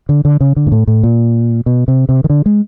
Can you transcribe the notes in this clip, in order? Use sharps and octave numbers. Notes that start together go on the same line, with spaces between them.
D3
D3
C#3
D3
G#2
A2
A2
A#2
B2
C3
C3
D#3
D3
G#3